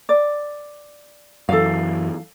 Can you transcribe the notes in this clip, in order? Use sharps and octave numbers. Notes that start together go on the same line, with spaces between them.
D5
F#2 E3 A4 F5